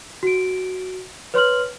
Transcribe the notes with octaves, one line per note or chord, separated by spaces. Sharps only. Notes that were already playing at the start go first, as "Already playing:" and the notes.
F#4 D7
B4 C#5 C6 F6 F#7